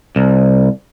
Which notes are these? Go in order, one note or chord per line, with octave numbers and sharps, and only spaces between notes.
C2